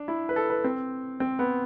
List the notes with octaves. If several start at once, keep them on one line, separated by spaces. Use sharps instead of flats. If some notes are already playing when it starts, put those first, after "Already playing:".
Already playing: D4
E4
B4
A4
B4
C4
C4
B3